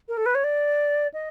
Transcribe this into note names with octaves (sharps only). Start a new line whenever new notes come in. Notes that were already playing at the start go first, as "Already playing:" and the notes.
A#4
A4
B4
C#5
D5
D#5